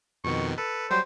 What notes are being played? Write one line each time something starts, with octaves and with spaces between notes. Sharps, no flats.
F2 B2 D#3 C#6
A4 B4
F#3 G3 C5